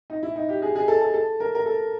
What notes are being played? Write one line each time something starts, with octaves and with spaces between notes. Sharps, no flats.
D#4
E4
D#4
G4
G#4
G#4
A4
A4
A4
A#4
A#4
A4